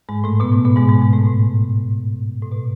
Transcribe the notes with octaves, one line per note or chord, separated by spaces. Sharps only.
G#2 G#3
A2 A3
B2 B3
A2 A3
B2 B3
G#2 G#3
G#2 G#3
G#2 G#3
A2 A3
A2 A3
A2
B2